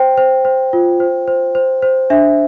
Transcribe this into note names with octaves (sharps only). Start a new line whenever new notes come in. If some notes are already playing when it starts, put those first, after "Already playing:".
Already playing: C5 G5
C5
C5
F4
C5
C5
C5
C5
D4 E5